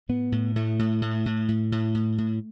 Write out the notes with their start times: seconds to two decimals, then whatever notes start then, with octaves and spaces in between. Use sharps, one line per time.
0.09 A2 B3
0.32 A2
0.56 A2 A3
0.79 A2
1.01 A2
1.26 A2
1.48 A2
1.72 A2
1.95 A2
2.18 A2